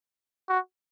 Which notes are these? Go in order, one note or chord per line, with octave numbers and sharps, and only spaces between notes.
F#4